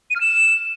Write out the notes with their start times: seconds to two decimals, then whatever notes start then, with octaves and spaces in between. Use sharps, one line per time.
0.10 D#7
0.16 F6
0.21 E7